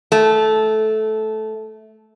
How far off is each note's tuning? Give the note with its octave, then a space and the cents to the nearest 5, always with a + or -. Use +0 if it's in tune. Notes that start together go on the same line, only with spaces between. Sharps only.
A3 -15